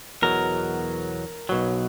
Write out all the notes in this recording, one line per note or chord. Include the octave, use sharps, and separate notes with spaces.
E2 B2 F#3 A#4
B1 B2 F#3